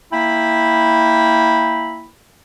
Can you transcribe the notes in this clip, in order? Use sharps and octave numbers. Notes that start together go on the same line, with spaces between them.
A#3 E4 G5 B5